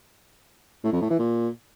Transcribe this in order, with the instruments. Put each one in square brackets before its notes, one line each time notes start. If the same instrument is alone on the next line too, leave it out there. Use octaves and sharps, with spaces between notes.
[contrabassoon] A2
F2
A2
E3
A#2